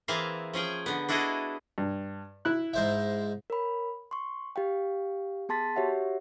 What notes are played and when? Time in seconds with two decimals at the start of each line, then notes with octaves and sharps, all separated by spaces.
0.08 E3 A#3 C4 G#4 E5 F5
0.53 F3 C#4 G#4 G5
0.86 D3 B3
1.09 D4 E4 F#4 G#4 A4 D#5
1.78 G2
2.45 E4 F#6
2.73 G#2 C5 E5
3.50 A#4 C#5 B5
4.11 C6 C#6
4.56 G4 F5 G5
5.49 B3 G#4 A5 C6 A6 B6
5.76 F#4 G4 C#5 E5 F#5